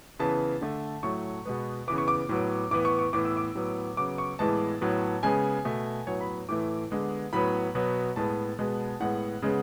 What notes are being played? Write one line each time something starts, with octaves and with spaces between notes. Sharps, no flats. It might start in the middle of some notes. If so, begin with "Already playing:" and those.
C#3 E3 B3 A5
D3 A3
A2 F#3 A3 C#6
B2 G#3 B3
C#3 E3 B3 D6
C#6
D6
A2 F#3 B3
A2 E3 B3 D6
C#6
C#6
A2 E3 B3 D6
E6
D6
A2 F#3 B3
C#3 F#3 B3 D6
C#6
A2 E3 G#3 B3 A5
A2 F#3 B3
C#3 G#3 B3 G#5
B2 A3
A2 F#3 B3 C#5
B5
A2 E3 A3 D6
D3 G#3 B3
A2 F#3 B3 B5
B2 F#3 B3
A2 G#3 B3 A5
B2 G#3 B3
A2 G#3 B3 F#5
C#3 G#3 B3